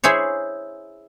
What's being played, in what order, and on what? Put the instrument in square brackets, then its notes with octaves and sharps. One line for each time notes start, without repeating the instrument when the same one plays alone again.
[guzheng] E4 G#4 C5 C#5